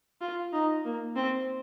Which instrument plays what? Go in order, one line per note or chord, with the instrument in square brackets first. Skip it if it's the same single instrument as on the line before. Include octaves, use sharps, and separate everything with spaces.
[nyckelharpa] F4
D#4
A#3
C4